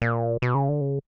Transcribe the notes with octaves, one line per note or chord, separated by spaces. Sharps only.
A#2
B2
C#3
D3
C#3